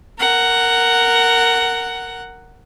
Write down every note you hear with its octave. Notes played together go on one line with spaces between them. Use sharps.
A#4 F#5